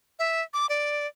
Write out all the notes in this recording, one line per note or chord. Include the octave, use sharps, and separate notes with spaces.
E5
D6
D5